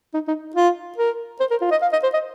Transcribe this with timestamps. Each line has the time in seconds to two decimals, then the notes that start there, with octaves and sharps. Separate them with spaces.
0.14 D#4
0.28 D#4
0.56 F4
0.98 A#4
1.40 C5
1.51 A#4
1.61 F4
1.72 D#5
1.82 F5
1.93 D#5
2.03 C5
2.14 D#5